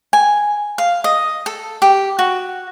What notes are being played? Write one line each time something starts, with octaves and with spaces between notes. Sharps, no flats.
G#5
F5
D#5
A4
G4
F#4